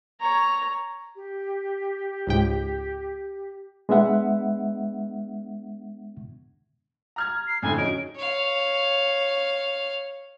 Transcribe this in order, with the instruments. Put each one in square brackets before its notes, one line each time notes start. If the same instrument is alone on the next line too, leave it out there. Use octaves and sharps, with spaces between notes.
[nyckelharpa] C#5 A#5
[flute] G4
[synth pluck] C#2 G#2 G5
[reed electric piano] G#3 B3 D4 E5 F#5
[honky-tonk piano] A#5 F6 G#6
[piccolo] C7
[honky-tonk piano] F2 A2 D3 [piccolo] G#5
[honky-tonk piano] F#3 C#4 D#4 [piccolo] D7
[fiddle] C#5 F5